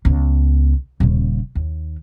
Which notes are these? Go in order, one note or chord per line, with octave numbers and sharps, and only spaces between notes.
C#2 B3
D#1 C#3
D#2